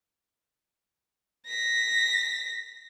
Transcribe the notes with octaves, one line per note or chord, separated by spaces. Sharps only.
A#6 B6